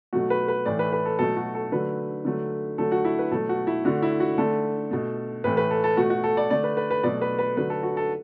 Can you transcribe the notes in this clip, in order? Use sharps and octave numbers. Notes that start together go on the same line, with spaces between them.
B2 F#3 A3 F#4
B4
B4
A2 E3 A3 D5
B4
B4
A4
B2 F#3 A3 A4
F#4
A4
D3 F#3 A3 B4
D3 F#3 A3
D3 F#3 A3 A4
F#4
E4
B4
B2 F#3 A3 A4
F#4
E4
D3 A3 F#4
E4
F#4
D3 A3 A4
B2 A3
A2 E3 A3 B4
B4
A4
A4
B2 A3 F#4
F#4
A4
D5
D3 A3 D5
B4
B4
B4
B2 F#3 A3 D5
B4
B4
D3 F#3 A3 B4
A4
F#4
A4